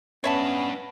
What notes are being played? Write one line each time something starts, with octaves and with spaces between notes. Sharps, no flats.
B3 C#4 D4 B4 C#5 E5 A5